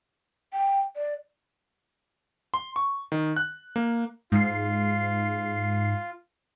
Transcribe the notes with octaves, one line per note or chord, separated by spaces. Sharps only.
G5
D5
C6
C#6
D#3
F#6
A#3
G#2 F4 C7